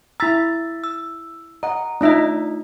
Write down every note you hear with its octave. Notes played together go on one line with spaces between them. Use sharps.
E4 A#5 E6 A6 B6
E6
D#5 F#5 A#5
A3 D4 D#4 F4 D#5 E5